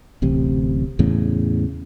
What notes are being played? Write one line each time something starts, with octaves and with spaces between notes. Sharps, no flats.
D1 A1 C3
E2 A2 C#3